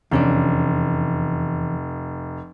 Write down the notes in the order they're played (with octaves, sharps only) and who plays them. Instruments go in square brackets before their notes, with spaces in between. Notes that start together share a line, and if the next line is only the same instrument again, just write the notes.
[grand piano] F1 [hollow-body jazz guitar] E2 C#4 D4